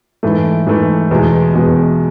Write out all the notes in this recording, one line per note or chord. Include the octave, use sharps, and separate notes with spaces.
G#2 E3 A3
G#2 E3 A3
E2 B2 G#3
E2 B2 G#3